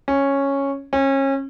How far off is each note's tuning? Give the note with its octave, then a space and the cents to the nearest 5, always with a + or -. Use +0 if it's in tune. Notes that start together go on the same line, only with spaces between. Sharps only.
C#4 -5
C#4 -30